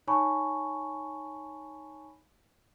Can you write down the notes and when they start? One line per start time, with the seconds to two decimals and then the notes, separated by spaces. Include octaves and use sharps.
0.07 D#4 C#5 G#5 A5 B5 C#6